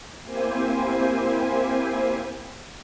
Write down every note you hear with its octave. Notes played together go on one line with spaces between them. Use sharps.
A#3 C4 E4 G4 C5 G#5